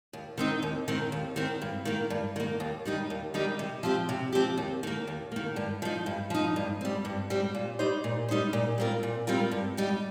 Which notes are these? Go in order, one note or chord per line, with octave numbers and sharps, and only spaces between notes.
D#2
D#3 C4 D#4
D#2
D#3 C4
D#2
D#3 C4
G2
D#3 A#3
G2
D#3 A#3
D#2
D#3 G3 D#4 G4
D#2
D#3 G3 D#4 G4
C3
F3 C4 G4
C3
F3 C4 G4
D#2
D#3 A#3
D#2
D#3 A#3
G2
F3 D#4
G2
F3 D#4
G2
G3 C4
G2
G3 C4
A#2
G3 D#4 C5
A#2
G3 D#4 C5
A#2
G3 C4 F4 A#4
A#2
G3 C4 F4 A#4
G2
G3 D#4 G4